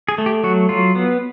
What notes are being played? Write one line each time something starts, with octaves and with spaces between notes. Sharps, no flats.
G#4
A3
G4
F#3 F#4
F#3 F4
B3